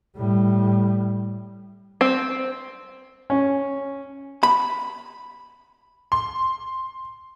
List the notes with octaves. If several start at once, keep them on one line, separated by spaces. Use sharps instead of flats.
A2 G3
C4
C#4
B5
C6